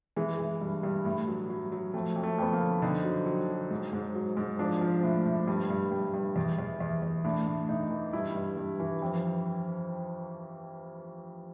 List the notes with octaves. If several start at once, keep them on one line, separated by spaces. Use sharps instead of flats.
E3 G#3
E3
G2
G2
A2
F#3
F#3
F#3
F2 A3
F2
A3
F2 B3
A#3
D3
D3 D#4
F#3
F#3
F#3
G#2
G#2
F#3
G#2
F3 D4
F3
A2
A2
G2
G2
G2
G2
E2
E2
E2
E2
A2 D4
A2
A2 D#4
E3
G2 E4
G2
G2
E3
F2